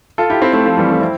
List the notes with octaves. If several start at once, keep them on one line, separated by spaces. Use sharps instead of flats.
F4 A4
E4 G4
C4 E4
A3 C4
F3 A3
E3 G3
F3 A3
C4 E4